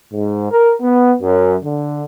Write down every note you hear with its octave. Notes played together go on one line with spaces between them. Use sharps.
G#2
A#4
B3
F#2
D3